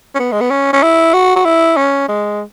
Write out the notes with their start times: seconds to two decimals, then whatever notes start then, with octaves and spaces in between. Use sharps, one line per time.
0.15 C#4
0.19 B3
0.32 G#3
0.41 B3
0.51 C#4
0.73 C#4
0.83 E4
1.14 F#4
1.36 F#4
1.45 E4
1.77 C#4
2.08 G#3